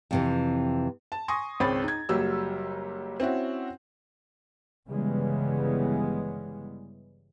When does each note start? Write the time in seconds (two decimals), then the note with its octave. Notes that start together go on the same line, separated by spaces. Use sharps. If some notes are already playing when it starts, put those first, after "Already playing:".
0.11 F2 C3 E3
1.12 A5
1.28 G#5 C6 C#6 D#6 A#6
1.60 G#1 C#2 C4 C#5 B5 A6
1.84 D#4 G#6
2.09 F#1 F#3 G3 G4 E6
3.20 C4 C#4 E4 F#4
4.87 G1 C#3 E3 G3 G#3 B3